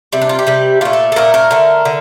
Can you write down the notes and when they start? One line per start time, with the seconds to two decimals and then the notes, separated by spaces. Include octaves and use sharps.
0.13 C3 G3
0.21 D4
0.29 F4
0.39 G4
0.47 C3 G3
0.81 A#2 A3 F4
0.93 A4
1.12 A4
1.16 A#2 A3 A#4
1.34 A#4
1.51 D3 A3
1.85 D3